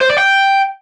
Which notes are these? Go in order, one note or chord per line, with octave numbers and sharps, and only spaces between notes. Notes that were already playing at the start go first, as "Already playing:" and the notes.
C5
D5
G5